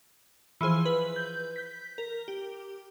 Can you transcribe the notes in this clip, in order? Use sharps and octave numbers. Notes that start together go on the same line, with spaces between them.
E3 F3 G#4 C5
B4
G6
G6 B6
A#4
G4